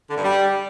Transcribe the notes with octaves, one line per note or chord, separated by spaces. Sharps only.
D3
G2
G3